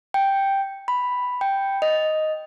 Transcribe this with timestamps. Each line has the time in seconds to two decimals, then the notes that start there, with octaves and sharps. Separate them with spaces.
0.14 G5
0.88 B5
1.41 G5
1.82 D#5